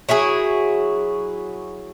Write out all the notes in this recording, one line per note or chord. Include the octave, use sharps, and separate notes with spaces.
F#3 E4 F#4 G#4